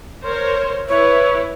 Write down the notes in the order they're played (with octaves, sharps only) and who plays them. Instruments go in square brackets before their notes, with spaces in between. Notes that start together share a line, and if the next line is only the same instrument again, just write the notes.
[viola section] A#4 C5 C#5
[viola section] E4 B4 [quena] C#5